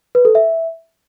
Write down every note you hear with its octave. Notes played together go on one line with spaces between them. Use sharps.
B4
A4
E5